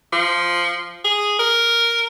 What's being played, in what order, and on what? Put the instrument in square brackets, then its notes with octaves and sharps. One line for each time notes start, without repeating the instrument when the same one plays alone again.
[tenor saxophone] F3
G#4
A#4